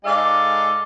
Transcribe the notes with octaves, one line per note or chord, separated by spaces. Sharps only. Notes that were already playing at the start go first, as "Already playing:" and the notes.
G#2 G#3 A4 D5 D#5 F5